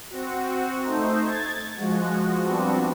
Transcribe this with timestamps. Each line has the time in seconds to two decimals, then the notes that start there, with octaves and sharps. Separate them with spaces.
0.10 C4 F#4
0.82 A3 D#4 C5
1.25 G#6 A6
1.77 F3 G#3 F#4
2.42 F3 G3 B3 C4 D4 F#4